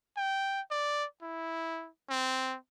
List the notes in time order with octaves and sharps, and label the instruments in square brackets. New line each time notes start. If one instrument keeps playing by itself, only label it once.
[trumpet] G5
D5
E4
C4